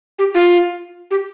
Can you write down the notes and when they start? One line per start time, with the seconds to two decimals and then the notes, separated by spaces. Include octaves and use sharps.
0.19 G4
0.35 F4
1.11 G4